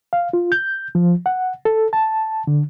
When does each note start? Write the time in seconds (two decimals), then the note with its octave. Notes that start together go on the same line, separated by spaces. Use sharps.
0.13 F5
0.33 F4
0.52 G6
0.95 F3
1.26 F#5
1.65 A4
1.93 A5
2.47 D3